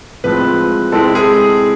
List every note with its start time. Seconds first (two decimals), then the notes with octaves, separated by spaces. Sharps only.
0.24 A2 F3 G#3 C4 B4
0.92 C3 G#3 C4 E4 A4
1.15 G#4